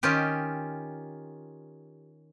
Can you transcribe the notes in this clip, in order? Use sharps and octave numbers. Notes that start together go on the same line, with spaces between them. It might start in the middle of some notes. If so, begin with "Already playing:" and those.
D#3 C#4 F4 G4